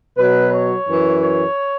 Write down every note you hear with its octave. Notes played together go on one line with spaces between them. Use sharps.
B2 F#3 B4
C#5
F#2 E3
C#5